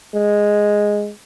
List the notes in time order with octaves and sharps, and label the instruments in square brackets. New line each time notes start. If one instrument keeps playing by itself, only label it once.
[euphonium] G#3